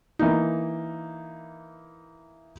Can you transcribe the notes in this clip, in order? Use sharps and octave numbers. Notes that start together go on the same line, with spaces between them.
E3 A#3 D#4